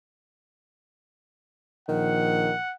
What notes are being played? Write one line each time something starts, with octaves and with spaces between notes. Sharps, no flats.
A#1 D#3 F#5